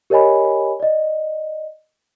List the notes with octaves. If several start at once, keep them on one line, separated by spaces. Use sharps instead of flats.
G4 A#4 C#5 D#5 G#5 B5
D5 D#5